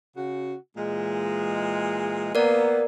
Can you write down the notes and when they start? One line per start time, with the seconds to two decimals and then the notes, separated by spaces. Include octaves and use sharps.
0.16 C#3 F#4
0.77 A#2 E3 G#3
2.35 A#3 B3 A#4 D5